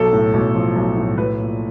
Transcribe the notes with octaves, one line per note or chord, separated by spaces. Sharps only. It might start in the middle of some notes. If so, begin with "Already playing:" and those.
Already playing: B1 A4
A2
B1
F3
B1
A2
B1 B4
A#2